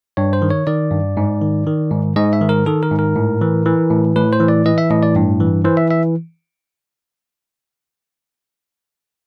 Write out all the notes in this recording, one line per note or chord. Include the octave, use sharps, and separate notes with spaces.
G2 C#5
C5
D#3
C#5
D#3 D5
G2
G#2
D#3
D#3
G#2
G#2 D#5
E5
D#3
A#4
D#3 A4
A#4
G#2
A#4
A2
E3
E3
A2
A2 B4
C5
E3
D5
E3 D#5
E5
A2 D#5
D5
G2
E3
E3 C5
E5
E5